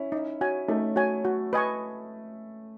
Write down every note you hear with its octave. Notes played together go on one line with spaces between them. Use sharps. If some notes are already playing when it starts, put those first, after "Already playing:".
Already playing: C#4 E4
D#4
F#4 C#5 G#5
A3 C#4 D#4
F#4 C#5 G#5
F#4
B4 D#5 G#5 C#6